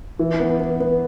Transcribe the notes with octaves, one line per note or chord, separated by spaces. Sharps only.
E3
B3
B3
B3